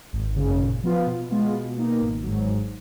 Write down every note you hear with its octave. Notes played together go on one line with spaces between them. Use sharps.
G#1
C#3
F#2
A#2
F3 B3 F4
B2
G#3 B3 F4
B2
A#3 D#4
G#1
G#2 F#3
G#2